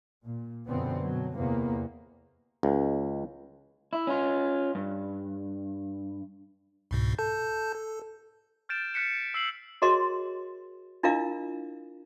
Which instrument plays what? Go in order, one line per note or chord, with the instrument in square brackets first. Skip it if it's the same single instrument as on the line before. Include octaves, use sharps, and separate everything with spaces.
[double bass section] A#2
F#2 B2 D3 F3 B3 C4
B2 F#3
E2 C3 A#3 B3
[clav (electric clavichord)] C#2
[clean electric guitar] E4
C#4 F4
G2
[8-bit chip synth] C2 G#2 B2
A4 A5 G6
A4
[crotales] F6 G6 A6 D7 E7
F6 F#6 B6 C#7 E7
E6 C7 F#7
[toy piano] F#4 G#4 A#4 C#5 D#5 C6
D4 E4 F4 A#4 D#5 F5